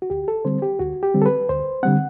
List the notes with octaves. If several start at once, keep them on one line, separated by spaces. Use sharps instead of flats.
F#4
D2 G4
A4
D3 G3 C4 C5
G4
D2 F#4
G4
D3 G3 C4
A4
B4
D2 C5
D3 G3 C4 F#5